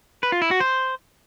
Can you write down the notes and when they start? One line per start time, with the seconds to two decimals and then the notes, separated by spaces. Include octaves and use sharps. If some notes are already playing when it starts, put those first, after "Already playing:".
0.23 B4
0.32 F4
0.42 E4
0.51 F#4
0.60 C5